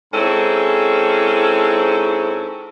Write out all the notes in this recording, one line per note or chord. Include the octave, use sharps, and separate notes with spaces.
G#2 G#3 C4 C#4 E4 A4